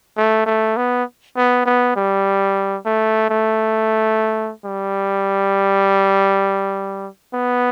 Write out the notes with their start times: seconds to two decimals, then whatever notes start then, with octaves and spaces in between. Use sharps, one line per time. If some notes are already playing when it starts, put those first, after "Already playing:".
0.17 A3
0.46 A3
0.77 B3
1.37 B3
1.66 B3
1.96 G3
2.86 A3
3.30 A3
4.66 G3
7.35 B3